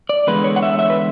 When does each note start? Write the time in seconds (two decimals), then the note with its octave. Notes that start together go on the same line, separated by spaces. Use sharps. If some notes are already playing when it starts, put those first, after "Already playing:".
0.09 D5
0.27 E2 D3 G#3 B4
0.44 C#5
0.56 F#5
0.62 E5
0.79 E5
0.90 B4